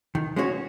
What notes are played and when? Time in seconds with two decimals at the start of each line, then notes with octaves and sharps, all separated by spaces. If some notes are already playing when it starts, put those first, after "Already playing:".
0.15 D#3
0.36 G#3 C#4 F#4 C#5